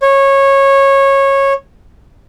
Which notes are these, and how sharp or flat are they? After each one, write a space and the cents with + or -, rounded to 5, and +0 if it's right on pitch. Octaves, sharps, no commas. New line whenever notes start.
C#5 -15